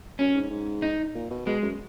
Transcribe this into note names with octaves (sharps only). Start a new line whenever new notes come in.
F#2 C#4
G#2
G#2
D#4
A#2
B2
B2 G#3
F#2